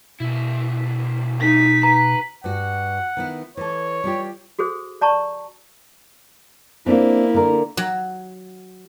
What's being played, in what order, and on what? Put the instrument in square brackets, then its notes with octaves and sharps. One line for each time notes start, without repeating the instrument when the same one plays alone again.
[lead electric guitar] D2 E4 [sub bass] B2
[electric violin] D#4 B6
[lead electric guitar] B4 [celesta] A#5
[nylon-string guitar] G2 F#4 [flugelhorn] F#5
[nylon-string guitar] D#3 B3 E4
[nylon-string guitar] E3 A4 [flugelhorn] C#5
[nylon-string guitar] G3 F4 G4
[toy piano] F#4 G#4 A4 C5
D5 A5 A#5 C#6
[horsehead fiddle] A#3 E4 [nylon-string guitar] C4 D4
[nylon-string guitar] D3 A#4
[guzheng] F#3